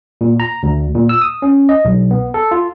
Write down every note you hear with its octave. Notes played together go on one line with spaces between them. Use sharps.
A#2
A#5
D2
A#2
E6
D#6
C#4
D#5
B1
B3
A4
F4